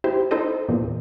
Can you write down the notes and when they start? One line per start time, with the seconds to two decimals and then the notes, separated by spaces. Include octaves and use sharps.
0.04 E4 G4 C5
0.31 D#4 E4 A4 C5 D#5
0.68 E2 A#2